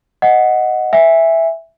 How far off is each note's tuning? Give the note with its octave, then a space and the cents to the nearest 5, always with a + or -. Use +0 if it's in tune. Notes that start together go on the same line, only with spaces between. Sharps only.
D#5 +0 F#5 +0
E5 +0 G#5 -25